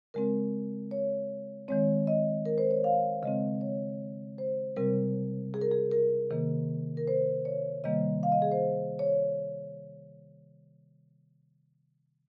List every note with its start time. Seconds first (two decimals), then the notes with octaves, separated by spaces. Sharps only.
0.14 C#3 G#3 C4 A#4
0.91 C#5
1.68 D#3 G#3 C4 C#5
2.07 D#5
2.46 A#4
2.58 C5
2.71 C#5
2.84 F5
3.23 C#3 G#3 C4 D#5
3.61 C#5
4.38 C5
4.76 C3 G3 C4 A#4
5.54 G#4
5.62 A#4
5.71 G#4
5.91 A#4
6.31 C3 D#3 A#3
6.97 A#4
7.08 C5
7.45 C#5
7.84 C3 D#3 G3 A#3 D#5
8.23 F5
8.32 D#5
8.42 G#4
8.52 C5
8.99 C#5